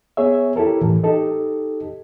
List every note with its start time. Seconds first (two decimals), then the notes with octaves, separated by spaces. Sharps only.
0.17 B3 G#4 C#5 E5
0.56 E4 G4 A4 A#4
0.81 A2 E3
1.04 D#4 G4 A4 D#5